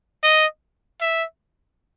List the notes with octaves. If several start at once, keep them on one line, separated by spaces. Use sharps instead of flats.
D#5
E5